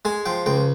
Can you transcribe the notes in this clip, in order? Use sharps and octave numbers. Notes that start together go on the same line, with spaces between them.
G#3 G#5
F3 G5
C#2 G5